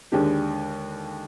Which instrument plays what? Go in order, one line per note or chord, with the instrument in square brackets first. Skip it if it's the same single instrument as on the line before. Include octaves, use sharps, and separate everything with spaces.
[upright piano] D#2 D3 G#3 D4 G4